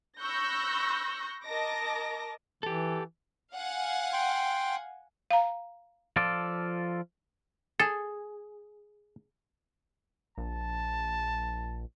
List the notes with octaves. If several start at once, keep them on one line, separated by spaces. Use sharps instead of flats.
B5 C#6 E6 F#6 G6 A#6
A#4 D#5 A5 D6 A#6
E3 G4 A4
F5 F#5 G#5
G5 C6
F5 A#5
F3 F4 A4 D5
G#4 A4
A#1 A5